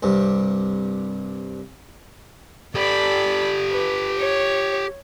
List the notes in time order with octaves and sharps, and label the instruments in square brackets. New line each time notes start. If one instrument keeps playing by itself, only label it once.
[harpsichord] C2 G2 C3
[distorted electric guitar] G4 A4 [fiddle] D5 B5
[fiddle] B4
C#5